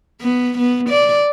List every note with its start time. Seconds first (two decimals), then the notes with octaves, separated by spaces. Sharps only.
0.21 B3
0.58 B3
0.90 D5